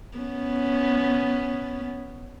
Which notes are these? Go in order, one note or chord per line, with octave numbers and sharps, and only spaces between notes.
B3 C#4